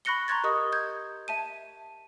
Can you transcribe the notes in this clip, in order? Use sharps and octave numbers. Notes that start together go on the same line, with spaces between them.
B5 C#6 F#6 A#6 C#7 G7
A#5 C6 C#6 F#6 G#6 A6
G4 A#4 D#5 C#6 D#6
G6 G#6
E5 A5 D#7